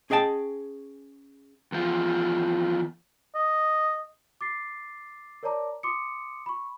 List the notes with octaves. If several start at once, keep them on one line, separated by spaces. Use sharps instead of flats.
C#4 G#4 D#5 G5 A5
E2 F3
D#5
D6 A6 C7
A#4 C#5 D5 A5 A#5 D6
C6 D6 D#6 C#7
B5 C#6